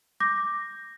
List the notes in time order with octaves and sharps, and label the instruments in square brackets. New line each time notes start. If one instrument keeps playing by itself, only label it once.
[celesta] D6 G6 A#6